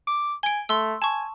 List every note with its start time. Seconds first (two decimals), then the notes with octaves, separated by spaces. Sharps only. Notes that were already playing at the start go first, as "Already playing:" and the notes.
0.07 D6
0.43 G#5 D7 G7
0.69 A3 C6 E6
1.02 G#5 A5 C#6